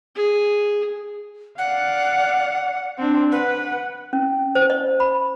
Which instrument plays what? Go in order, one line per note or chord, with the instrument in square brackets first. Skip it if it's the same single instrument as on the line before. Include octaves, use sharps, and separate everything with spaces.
[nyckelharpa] G#4
[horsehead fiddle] D5 F5 [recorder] F#5
[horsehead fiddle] C4 D4
[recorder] B4 [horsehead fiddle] F#5
[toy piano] C#4
C5
D#5
B5